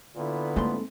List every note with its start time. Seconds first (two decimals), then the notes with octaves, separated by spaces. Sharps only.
0.16 A#2 D3 B3 E4
0.56 G#2 A3 A#3 C4 C6